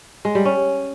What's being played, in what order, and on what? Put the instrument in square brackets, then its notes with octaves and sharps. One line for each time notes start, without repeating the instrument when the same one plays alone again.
[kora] G#3
G3
C#4